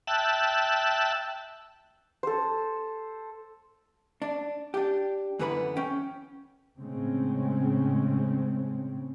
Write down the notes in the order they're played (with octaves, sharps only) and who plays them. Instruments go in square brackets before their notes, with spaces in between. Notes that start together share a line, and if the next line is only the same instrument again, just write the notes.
[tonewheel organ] E5 G5 A5 E6 F#6
[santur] A4 C5
[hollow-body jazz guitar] D4
D4 G4
F#2 D3 E3 B3 B4 B5
C#4 G5
[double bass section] A2 C#3 G#3 C4 C#4